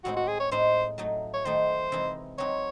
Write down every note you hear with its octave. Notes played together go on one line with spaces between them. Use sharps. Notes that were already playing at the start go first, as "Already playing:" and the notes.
A2 G#3 C4 D#4 F#4
F#4
G#4
C#5
A2 G#3 D#4 C5
F#3 A3 D#4
C#5
D#3 A3 D#4 C5
C3 E3 G#3 D#4
F#3 C4 D#4 C#5